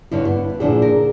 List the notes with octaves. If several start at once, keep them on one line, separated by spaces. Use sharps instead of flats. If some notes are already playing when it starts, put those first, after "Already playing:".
G2 D3 C#4 E4
B3
A#2 D3 F3 D4 G#4
A#4